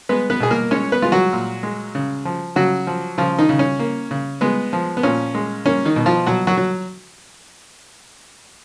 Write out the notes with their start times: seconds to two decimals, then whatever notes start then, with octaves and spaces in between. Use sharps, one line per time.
0.09 G#3 B3 B4
0.30 B3 B4
0.40 B2 G#4
0.51 A#3 A#4
0.71 G#3 C#4 C#5
0.92 B3 B4
1.02 G#3 F4
1.12 F#3 F#4
1.33 A#2
1.63 G#3
1.95 C#3
2.25 F3
2.56 C#3 F#3 F#4
2.87 F3
3.18 C#3 F3 F4
3.39 D#3 D#4
3.49 C#3
3.59 C#4
3.79 A#3
4.11 C#3
4.41 G#3 B3
4.73 F3
4.97 B3
5.03 A#2 C#4
5.35 G#3
5.66 A#3 C#4
5.85 D#3 D#4
5.96 B2
6.06 F3 F4
6.27 B2 F#3 F#4
6.47 F#3 F#4
6.57 F#3